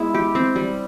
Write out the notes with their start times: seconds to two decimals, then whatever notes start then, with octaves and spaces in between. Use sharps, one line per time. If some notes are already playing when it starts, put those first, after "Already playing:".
Already playing: G#3 B3 E4
0.14 G4
0.35 C4
0.56 G3